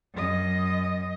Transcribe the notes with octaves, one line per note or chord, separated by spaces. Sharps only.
F#2 D#5